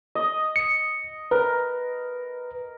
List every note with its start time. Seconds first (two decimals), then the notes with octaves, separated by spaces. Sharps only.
0.15 D#5
0.56 C#7
1.31 A#4 B4